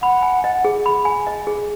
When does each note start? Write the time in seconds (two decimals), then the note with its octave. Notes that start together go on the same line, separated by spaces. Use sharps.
0.02 F#5 B5
0.23 G#5
0.44 D#5
0.64 G#4
0.86 B5
1.05 G#5
1.27 D#5
1.47 G#4